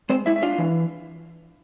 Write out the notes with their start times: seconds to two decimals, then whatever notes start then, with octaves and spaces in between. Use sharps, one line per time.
0.09 G#3 C4 C5
0.26 G#3 E4 E5
0.36 E5
0.42 D4 F4 F5
0.58 E3